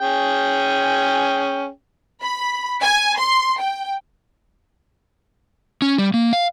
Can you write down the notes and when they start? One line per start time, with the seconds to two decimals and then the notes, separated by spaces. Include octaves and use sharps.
0.01 C#4 G#4 G5
2.22 B5
2.81 G#5
3.18 C6
3.59 G5
5.82 C#4
5.98 G3
6.14 A#3
6.33 F5